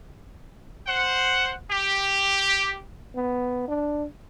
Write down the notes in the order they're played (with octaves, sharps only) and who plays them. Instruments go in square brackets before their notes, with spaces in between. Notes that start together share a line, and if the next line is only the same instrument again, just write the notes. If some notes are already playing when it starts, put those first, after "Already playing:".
[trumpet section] C5 F#5
G4
[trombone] B3
D4